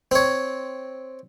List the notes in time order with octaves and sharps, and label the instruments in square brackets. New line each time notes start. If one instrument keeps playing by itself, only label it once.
[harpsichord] C4 C#5